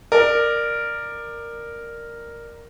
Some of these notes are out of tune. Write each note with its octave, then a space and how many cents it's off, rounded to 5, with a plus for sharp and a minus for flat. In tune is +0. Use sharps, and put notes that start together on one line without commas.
A#4 +0 D5 +20